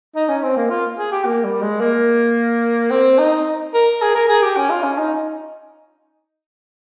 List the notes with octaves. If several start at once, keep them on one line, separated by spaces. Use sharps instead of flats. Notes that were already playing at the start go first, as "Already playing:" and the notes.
D#4
C#4
C4
A#3
F4
G#4
G4
A#3
G3
G#3
A#3
C4
D#4
A#4
G#4
A#4
G#4
G4
C#4
F4
C#4
D#4